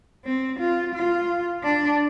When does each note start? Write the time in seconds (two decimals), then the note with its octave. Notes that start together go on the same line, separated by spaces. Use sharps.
0.25 C4
0.59 F4
0.94 F4
1.64 D4